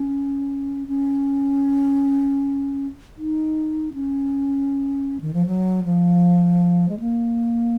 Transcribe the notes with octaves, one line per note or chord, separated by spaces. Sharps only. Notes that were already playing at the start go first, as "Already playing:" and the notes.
Already playing: C#4
C#4
D#4
C#4
D#3
F3
F#3
F3
G#3
A#3